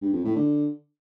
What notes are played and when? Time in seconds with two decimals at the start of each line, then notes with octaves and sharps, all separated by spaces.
0.02 G2
0.13 F2
0.25 A2
0.36 D3